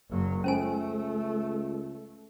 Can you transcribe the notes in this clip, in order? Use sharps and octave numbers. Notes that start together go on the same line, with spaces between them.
F#1 F#3 A#3
C#2 A3 C#4 C5 G#5